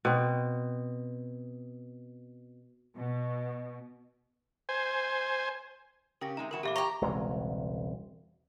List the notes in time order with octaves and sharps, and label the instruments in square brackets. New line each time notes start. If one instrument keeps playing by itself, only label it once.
[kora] B2 C4
[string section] B2
[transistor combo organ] C5 G#5
[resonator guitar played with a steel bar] C#3 C#4 G4 [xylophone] A#4 A#6
[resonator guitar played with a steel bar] C3 G#3 D#4 [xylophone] A#5
[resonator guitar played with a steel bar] C3 E3 F#4 [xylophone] A#4 E7
[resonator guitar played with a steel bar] A#2 E3 A3 [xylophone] G4 E5 D6
[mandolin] G4 A#5 [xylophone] C#6
[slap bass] E1 C2 C#3 G#3